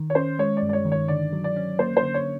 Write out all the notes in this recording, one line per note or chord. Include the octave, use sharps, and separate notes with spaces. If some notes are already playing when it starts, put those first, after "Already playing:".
Already playing: D#3
C#5
C#4 C5
G#3 C#5
D5
G2
D5
C#5
D#3
C#5
D3 D5
F#3
D5
C#4
A#3 C5
C5
D3
C#5